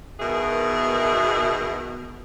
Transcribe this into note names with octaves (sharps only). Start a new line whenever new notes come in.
B2 D#3 E3 G#4 A#4